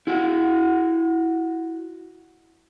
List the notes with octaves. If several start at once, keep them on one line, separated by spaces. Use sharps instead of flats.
E4 F#4 F#5